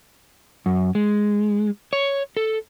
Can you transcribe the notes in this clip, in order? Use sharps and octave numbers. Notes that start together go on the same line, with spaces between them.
F#2
G#3
C#5
A4